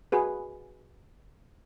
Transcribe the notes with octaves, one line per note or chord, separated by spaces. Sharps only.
F#4 G#4 B4